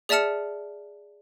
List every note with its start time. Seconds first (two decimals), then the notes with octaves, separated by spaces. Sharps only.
0.09 G#4 D5 E5 A5 F6 C#7